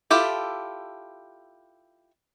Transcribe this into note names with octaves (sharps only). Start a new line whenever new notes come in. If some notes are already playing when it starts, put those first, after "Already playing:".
E4 F4 G4 A4